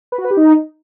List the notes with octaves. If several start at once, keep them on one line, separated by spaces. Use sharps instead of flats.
B4
F#4
B4
G4
D#4